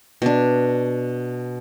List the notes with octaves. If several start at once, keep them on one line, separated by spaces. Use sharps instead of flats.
B2 D4